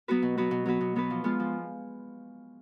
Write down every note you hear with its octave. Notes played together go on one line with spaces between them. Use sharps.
F#3 B3 F#4 B4
B2
F#3 B3 F#4 B4
B2
F#3 B3 F#4 B4
B2
F#3 B3 F#4 B4
F3
G#3 B3 F4
F3